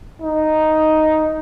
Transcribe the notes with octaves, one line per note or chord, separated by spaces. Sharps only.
D#4